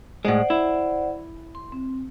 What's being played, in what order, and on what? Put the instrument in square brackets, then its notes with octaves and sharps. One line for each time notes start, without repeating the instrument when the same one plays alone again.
[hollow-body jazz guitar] A2 G#3 [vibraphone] C5 D5 F#5
[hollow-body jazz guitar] E4
[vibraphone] C6
C4